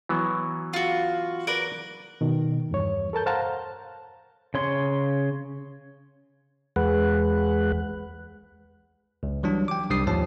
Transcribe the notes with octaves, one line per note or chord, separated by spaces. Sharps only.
E3 F#3 B3
F4 F#4
A#4 B4 D5
B2 D#3
E2 G2 C#5
A4 A#4 A5 G6
C5 F5 F#5 A5 A#5
C#3 C#5 C6
E2 G#3 B4 F#5
C#2
E3 F#3 G3 D4
G5 D6
C2 G3 D4 D#6 C7
D#2 G#2 F3 C#5 A5